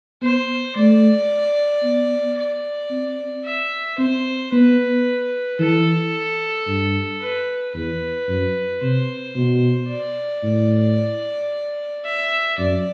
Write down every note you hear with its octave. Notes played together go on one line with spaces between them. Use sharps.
B3 C5
A3 D5
B3
D5
C4
E5
C4 C5
B3 B4
E3 A4
G2
B4
E2 B4
F#2
C3 C5
B2
D5
A2
E5
F#2 D5